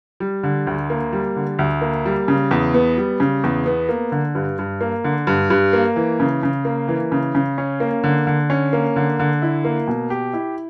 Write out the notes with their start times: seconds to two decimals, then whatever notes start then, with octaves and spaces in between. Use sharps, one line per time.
0.20 G3
0.43 D3
0.67 D2
0.90 A#3
1.13 G3
1.36 D3
1.59 D2
1.81 A#3
2.06 G3
2.28 C#3
2.51 E2
2.74 B3
2.97 G3
3.20 C#3
3.44 E2
3.66 B3
3.89 A#3
4.12 D3
4.35 G2
4.59 G2
4.81 A#3
5.04 D3
5.27 G2
5.50 G2
5.73 A#3
5.96 E3
6.20 C#3
6.43 C#3
6.65 A#3
6.88 E3
7.12 C#3
7.35 C#3
7.58 C#4
7.80 A#3
8.04 D3
8.27 D3
8.50 C#4
8.73 A#3
8.96 D3
9.19 D3
9.42 E4
9.65 A#3
9.88 B2
10.10 G4
10.33 E4